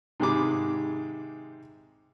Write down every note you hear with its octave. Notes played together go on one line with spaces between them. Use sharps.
G#2 C3 D#3 G#4 B5 D6